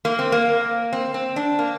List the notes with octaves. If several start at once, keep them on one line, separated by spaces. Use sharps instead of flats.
A#3
C4
A#3
C4
C4
D4
A#3